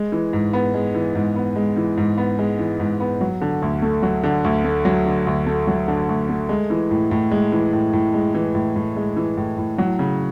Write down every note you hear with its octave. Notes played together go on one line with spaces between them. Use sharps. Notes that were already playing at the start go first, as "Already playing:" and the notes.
Already playing: G#3
E3
G#2
B3
G#3
E3
G#2
B3
G#3
E3
G#2
B3
G#3
E3
G#2
B3
F#3
D3
D2
A3
F#3
D3
D2
A3
F#3
D3
D2
A3
F#3
D3
D2
A3
G#3
E3
A2
A2
G#3
E3
A2
A2
G#3
E3
A2
A2
G#3
E3
A2
A2
F#3
C#3